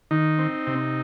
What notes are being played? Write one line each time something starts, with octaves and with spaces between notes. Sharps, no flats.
D#3 D#4
C4
C3